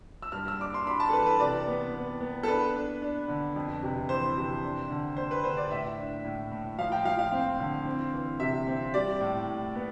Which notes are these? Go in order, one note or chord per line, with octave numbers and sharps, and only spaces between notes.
E6
G2 F6
E6
D4 D6
C6
D4 B5
A5
A4
E3 B4
B4
C3 D5
B3
B3
B3
A4
D4 B4
D4
D4
D3
F2
C3
E3 C5
C3
D4
D3
D4 C5
B4
D3 C5
D5
A2 E5
D4
A2
A2
F3 F5
G5
F3 F5
F5
C4
D3
C4
E3
C3 E5
C4
G3 D5
A2
A2
B3